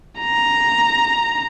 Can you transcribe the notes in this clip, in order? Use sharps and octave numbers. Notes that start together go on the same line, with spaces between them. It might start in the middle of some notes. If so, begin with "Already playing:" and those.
A#5